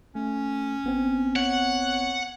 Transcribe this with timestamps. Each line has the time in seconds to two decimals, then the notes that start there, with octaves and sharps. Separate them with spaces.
0.15 A3 C#4
0.84 G#1 B3 C4
1.36 C#5 F#5